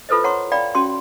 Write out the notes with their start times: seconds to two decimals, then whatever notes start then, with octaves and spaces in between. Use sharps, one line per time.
0.09 E4 F4 A4 B4 C5 D#5
0.24 C5 C#5 F#5 A#5 C6 C#6
0.52 D5 F5 G5 B5
0.75 C#4 F#4 G5 C6